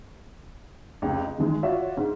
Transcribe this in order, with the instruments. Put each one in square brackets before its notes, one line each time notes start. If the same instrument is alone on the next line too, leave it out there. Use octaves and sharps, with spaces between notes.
[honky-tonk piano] F1 C#2
D#5
D#3 E3 G#3
F4 F#4 C#5 D5 E5 F#5
G#2